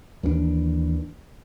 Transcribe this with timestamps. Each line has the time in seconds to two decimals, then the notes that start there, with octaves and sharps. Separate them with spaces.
0.23 D#2 E3 C4 D4